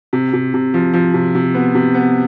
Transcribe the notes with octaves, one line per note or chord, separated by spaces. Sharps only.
C3
C3
C3
F3
F3
C3
C3
B3
C3
B3